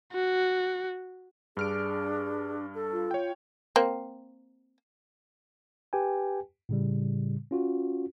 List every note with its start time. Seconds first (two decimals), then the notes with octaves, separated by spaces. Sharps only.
0.13 F#4
1.57 G2 D4 G#4 F6 D7
2.75 A4
2.93 F4
3.11 C#5 G5
3.76 A#3 C4
5.93 G4 B4 G5 G#5
6.69 A2 C#3 G3
7.51 C#4 F4 F#4